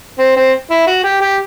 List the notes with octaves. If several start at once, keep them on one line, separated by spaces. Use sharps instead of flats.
C4
C4
E4
F#4
G4
G4